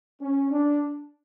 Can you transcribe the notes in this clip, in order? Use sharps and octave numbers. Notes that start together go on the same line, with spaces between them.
C#4
D4